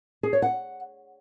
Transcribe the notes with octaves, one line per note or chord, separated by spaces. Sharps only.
G#4
C#5
F#5